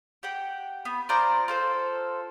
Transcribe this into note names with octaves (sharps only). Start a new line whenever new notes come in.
G4 F#5 G5
B3
F4 C5 D5 A#5
F4 A4 C5